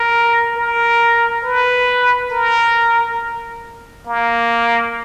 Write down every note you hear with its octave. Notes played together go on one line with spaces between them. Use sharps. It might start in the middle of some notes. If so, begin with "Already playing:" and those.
Already playing: A#4
A#4
B4
A#4
A#3